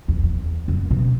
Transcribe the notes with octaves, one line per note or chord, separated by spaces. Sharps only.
E2
E2
F#2
B2